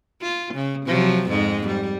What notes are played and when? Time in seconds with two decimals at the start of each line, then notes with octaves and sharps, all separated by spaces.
0.22 F4
0.54 C#3
0.86 C3 F3 F#3
1.28 F2 G#2 G#3
1.67 G3